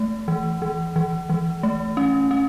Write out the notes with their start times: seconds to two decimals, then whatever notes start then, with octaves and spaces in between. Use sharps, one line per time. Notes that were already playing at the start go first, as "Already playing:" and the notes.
Already playing: A3
0.28 E3
0.62 E3
0.96 E3
1.30 E3
1.63 A3
1.97 C#4
2.31 C#4